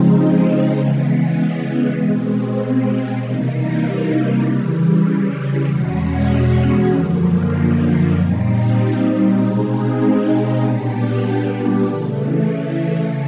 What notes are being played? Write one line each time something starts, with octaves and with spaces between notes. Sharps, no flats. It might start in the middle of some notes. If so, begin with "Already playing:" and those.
Already playing: C#3 F3 G#3 C4 D#4
C#3 E3 G#3 B3
B2 G#3 C4
C3 E3 G3 A#3 D#4
C#3 E3 G3
E2 B2 G#3 C#4 F#4
F#2 D3 F3 A#3
A#2 G3 C4 D#4
B2 G#3 C4 D#4 G#4
A#2 G3 B3 D4 G4
C#3 E3 A3